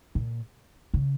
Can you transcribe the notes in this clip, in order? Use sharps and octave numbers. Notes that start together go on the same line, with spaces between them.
A#2
C#3